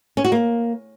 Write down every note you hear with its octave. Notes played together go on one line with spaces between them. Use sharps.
C#4
F#4
A#3